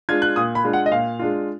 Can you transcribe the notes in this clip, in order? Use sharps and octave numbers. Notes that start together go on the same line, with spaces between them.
G#3 D4 F4 G#6
F#6
A#2 D#6
B5
G#3 D4 F4
F#5
D#5
A#2 F5
G#3 D4 F4